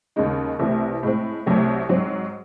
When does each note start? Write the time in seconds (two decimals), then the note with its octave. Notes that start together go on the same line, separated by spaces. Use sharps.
0.16 D#2 C#3 G#3 D#4
0.59 C2 C3 E3 A3
1.03 A2 G#3 C4
1.46 C2 C3 F#3 A3
1.89 G#2 F#3 C4